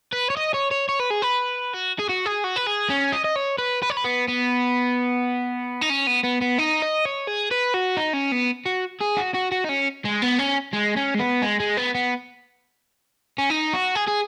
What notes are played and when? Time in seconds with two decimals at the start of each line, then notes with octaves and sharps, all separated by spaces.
0.13 B4
0.30 C#5
0.37 D#5
0.54 C#5
0.71 C#5
0.89 C#5
1.00 B4
1.11 G#4
1.22 B4
1.74 F#4
1.99 G#4
2.09 F#4
2.26 G#4
2.44 F#4
2.56 B4
2.67 G#4
2.90 C#4
3.12 D#5
3.24 D#5
3.36 C#5
3.58 B4
3.82 B4
3.90 C#5
3.97 B4
4.04 B3
4.28 B3
5.82 D#4
5.90 C#4
6.07 B3
6.24 B3
6.42 B3
6.58 D#4
6.82 D#5
7.05 C#5
7.27 G#4
7.51 B4
7.74 F#4
7.97 D#4
8.14 C#4
8.32 B3
8.66 F#4
9.01 G#4
9.17 F#4
9.35 F#4
9.52 F#4
9.65 D#4
9.69 C#4
10.05 G#3
10.22 B3
10.39 C#4
10.73 G#3
10.97 C#4
11.15 G#3
11.20 B3
11.42 G#3
11.60 G#3
11.77 B3
11.95 B3
13.38 C#4
13.50 D#4
13.73 F#4
13.95 G#4
14.08 G#4